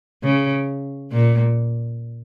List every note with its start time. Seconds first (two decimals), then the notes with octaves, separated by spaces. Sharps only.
0.24 C#3
1.12 A#2